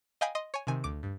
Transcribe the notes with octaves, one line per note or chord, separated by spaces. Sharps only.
D#5 F5 G5 G#5 B5 D#6
D#5 C6 D#6
C#5 G#5
C3 D#3 G#5
D2 D6 D7
G2